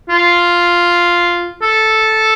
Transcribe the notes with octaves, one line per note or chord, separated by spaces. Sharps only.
F4
A4